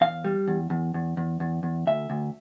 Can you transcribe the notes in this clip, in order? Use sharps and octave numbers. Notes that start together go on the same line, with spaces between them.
E2 F5
G3
E2
E2
E2
E2
E2
E2
D2 E5
D2